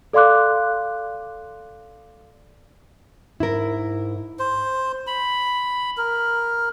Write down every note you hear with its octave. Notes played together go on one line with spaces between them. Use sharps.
A4 D5 F5 C6 D6 F#6
G#2 E4 A#4
C5
B5
A#4